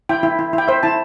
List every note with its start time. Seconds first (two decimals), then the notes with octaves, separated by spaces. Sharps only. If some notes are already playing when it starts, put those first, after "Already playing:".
0.09 E4 G5
0.23 E4
0.39 E4
0.53 E4 G5
0.68 C5 E5
0.83 E4 A5